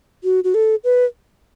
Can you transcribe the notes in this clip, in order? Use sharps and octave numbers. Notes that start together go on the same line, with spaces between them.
F#4
F#4
A4
B4